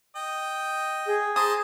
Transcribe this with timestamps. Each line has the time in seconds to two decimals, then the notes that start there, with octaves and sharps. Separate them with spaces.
0.16 D#5 G5
1.06 G#4
1.36 C5 A5 A#5 D#6